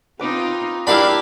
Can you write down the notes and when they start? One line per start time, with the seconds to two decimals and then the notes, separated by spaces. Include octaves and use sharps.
0.19 C4 D#4 F4 B4 D6
0.87 D4 E4 G4 A#4 F5 B5